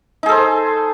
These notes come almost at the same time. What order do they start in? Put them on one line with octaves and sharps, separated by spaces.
D#4 G#4 A4 C5